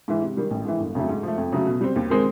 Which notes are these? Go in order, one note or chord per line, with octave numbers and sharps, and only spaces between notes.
G#2 E3
C3
D#3 G3
A1
G#2 E3
G1
F2 C#3 F#3 A3
G#2
F3 A3
F2
C#3 F#3 A3
B2
G3 C4
D#2
D#3 G#3 C4